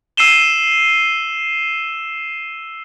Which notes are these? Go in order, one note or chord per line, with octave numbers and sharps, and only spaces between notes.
E6 C7 D#7 E7 G7